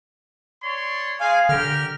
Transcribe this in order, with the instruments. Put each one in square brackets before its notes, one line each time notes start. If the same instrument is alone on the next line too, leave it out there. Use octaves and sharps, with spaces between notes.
[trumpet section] C#5 D5 C6
[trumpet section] G#3 G#4 [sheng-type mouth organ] F5 G#5
[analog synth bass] D3 [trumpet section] G4 A#4 G5 [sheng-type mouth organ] F6